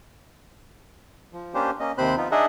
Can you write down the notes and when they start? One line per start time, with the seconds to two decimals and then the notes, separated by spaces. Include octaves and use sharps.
1.33 F3
1.54 A#3 C#4 D4 G4 C5
1.80 A#3 C#4 D#5
1.98 D#2 C3 C4 C5 B5 F#6
2.17 F3 B3 D#4 F4
2.31 D4 D#4 G#4 D#5 E5 F#5